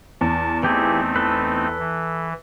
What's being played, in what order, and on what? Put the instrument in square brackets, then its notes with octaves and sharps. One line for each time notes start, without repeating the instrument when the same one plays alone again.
[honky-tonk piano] E2 [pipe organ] A5
[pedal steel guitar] E3 G4 G#4 [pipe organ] A3 C4 D#4
[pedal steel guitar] A4 B4
[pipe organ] E3